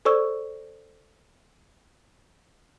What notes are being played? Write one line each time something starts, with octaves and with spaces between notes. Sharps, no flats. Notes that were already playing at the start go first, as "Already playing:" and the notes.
A4 C5 D5 C#6 E6